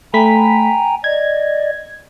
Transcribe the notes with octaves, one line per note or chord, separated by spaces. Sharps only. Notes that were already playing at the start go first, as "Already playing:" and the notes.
A3 G5 G#5 A#5 B5 B6
D5 D#5 G#6